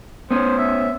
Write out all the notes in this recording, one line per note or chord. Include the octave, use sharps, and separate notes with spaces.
B3 C#4 C5
E5